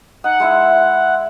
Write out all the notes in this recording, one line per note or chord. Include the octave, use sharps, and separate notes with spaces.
D#4 D#5 F#5
G#3 E4 E5